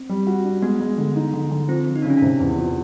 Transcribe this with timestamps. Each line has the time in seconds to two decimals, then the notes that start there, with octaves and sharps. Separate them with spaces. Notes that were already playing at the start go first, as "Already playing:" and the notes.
Already playing: C4
0.09 G3
0.27 F#4
0.44 D4
0.62 G#3 B3
0.80 G#3
0.98 D3
1.16 D#4
1.34 D3
1.51 D3
1.68 F3 C4
1.87 F3
1.96 D#4
2.02 D4
2.05 C#3
2.10 C#4
2.17 C3 D4
2.40 E2
2.57 F3